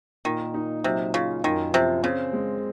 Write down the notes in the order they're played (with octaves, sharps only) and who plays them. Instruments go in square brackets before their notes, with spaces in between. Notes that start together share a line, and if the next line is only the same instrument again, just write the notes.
[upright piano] A#2 [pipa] D#3
[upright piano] D#4
[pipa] C3 [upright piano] F#3
[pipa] C#3 [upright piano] F4
[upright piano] F#2 [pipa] D#3
[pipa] C3 [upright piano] F3
[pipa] C#3 [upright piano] C4
[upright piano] G#3